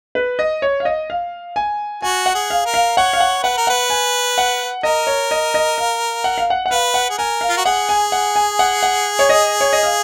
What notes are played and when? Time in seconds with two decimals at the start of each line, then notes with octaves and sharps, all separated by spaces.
0.15 B4
0.39 D#5
0.62 C#5
0.80 F5
0.85 D#5
1.10 F5
1.56 G#5
2.02 F#4 G#5
2.26 F#5
2.35 G#4
2.50 F5
2.66 A#4
2.74 F5
2.97 C#5 F#5
3.13 F5
3.20 F#5
3.43 B4 F#5
3.57 A#4
3.67 B4 F#5
3.90 G#5
4.38 F#5
4.83 A#4 D#5
5.07 C#5
5.31 D#5
5.54 D#5
5.78 F5
6.24 F#5
6.38 F5
6.50 F#5
6.66 F#5
6.71 B4 F5
6.94 F#5
7.10 G#4
7.18 A#4 G#5
7.41 F5
7.49 F4
7.57 F#4
7.65 G#4 F#5
7.89 G#5
8.12 F#5
8.36 G#5
8.59 F#5
8.83 F#5
9.19 C#5
9.29 D#5
9.61 C#5
9.73 D#5
9.83 F5